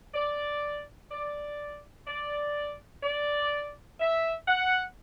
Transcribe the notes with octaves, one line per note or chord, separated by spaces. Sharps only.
D5
D5
D5
D5
E5
F#5